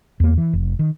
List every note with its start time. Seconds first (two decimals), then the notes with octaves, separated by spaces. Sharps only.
0.20 E2 A#3
0.38 E3
0.53 F1
0.79 D#3